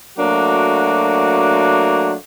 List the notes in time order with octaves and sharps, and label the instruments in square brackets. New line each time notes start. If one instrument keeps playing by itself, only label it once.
[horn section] F#3 A3 A#3 D4 F#4